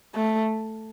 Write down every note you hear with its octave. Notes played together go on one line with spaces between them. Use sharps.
A3